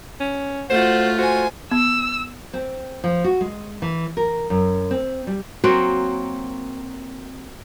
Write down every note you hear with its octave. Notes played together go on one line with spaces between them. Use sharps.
C#4
A3 F4 F#4 C5
F#4 C5 G#5
B3 E6
C4
F3
F#4
G#3
E3
A#4
F#2
C4
G3
F#3 A#3 C4 F#4